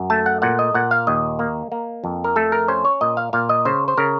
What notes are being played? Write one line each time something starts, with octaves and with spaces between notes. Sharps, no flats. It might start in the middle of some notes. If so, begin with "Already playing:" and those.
Already playing: F#2
A3 A5
F#5
A#2 F#5
D#5
A#2 F#5
F5
D#2 D#5
A#3
A#3
F2
A#4
A3 A4
A#4
C#4 C5
C#5
A#2 D#5
F5
A#2 F5
D#5
C#3 C5
C5
C#3 A#4